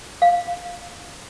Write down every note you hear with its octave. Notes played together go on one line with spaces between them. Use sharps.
F5